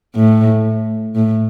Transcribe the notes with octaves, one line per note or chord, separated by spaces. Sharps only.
A2
A2